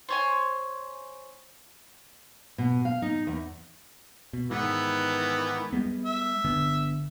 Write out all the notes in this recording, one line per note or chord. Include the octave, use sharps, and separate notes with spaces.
C5 C#5 G#5
B2
F5
D#4
E2
B2
G#2 D#3 E3 B3
G3 G#3 B3
E5
G1 D3 B3